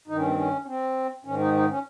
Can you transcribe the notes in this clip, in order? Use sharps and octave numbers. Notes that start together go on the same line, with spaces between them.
G2 D#3 D#4
C#4
C4
C#4
C#4
C4
G#2 D#3 C#4
D#4
D#4
C#4